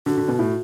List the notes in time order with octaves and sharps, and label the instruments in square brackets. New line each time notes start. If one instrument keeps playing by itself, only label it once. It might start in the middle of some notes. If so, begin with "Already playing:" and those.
[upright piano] D3 [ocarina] F#4
[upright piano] D3
B2
A2